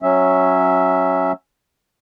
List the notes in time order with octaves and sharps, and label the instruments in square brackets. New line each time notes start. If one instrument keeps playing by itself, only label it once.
[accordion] F#3 C#4 E5